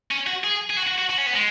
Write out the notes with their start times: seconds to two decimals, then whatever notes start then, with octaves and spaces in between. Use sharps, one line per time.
0.11 C#4
0.27 F#4
0.44 G#4
0.70 G#4
0.77 F#4
0.88 F#4
0.99 F#4
1.10 F#4
1.18 C#4
1.26 B3
1.35 G#3